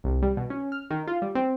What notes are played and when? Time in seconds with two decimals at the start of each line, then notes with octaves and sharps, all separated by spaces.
0.04 C2
0.22 G3
0.37 B2
0.50 C#4
0.72 F6
0.90 D#3
1.07 F4
1.22 G3
1.35 C4